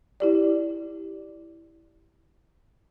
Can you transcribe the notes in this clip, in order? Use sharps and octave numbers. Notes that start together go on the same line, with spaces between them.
E4 G4 D5